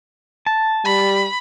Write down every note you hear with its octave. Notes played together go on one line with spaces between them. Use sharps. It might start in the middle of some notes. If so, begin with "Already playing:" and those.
A5
G3 B5